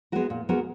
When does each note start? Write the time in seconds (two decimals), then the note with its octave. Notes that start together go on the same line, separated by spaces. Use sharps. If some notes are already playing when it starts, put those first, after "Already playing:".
0.12 G#3 B3 F#4 A#4
0.30 A#2
0.49 G#3 B3 F#4 A#4